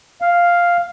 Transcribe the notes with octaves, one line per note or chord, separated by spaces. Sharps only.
F5